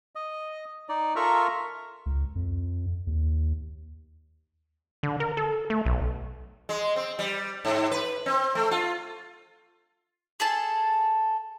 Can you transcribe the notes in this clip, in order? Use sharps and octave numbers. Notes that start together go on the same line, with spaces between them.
D#5
D#4 D5
F4 A4 A#4 E5 A#5 C#6
C#2
F2
D#2
D3
A#4
A4
A3
B1
G#3
C4
G3
G#2
B4
C4
A3
F4
G#4 A4 A5